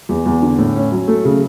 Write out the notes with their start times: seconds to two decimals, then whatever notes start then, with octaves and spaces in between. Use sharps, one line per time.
0.09 E2
0.26 E2
0.42 D3
0.59 A2
0.76 C#4
0.92 F#3
1.08 A3
1.25 C#3